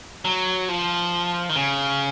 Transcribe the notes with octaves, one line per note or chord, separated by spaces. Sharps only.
F#3
F3
D#3
C#3